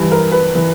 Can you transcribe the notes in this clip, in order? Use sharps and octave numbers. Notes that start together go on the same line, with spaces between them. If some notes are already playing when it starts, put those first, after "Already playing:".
Already playing: G2 E3
A#4
B4
E3